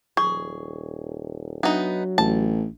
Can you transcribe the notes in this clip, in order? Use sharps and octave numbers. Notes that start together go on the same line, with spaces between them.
D#1 G#4 C#6
F#3 B3 D4 D#4 E5
A1 A5